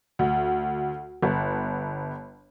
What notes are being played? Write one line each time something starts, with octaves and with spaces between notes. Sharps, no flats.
D2
G1